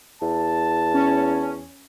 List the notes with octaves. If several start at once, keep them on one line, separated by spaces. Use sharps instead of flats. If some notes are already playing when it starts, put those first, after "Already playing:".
E2 A5
C#4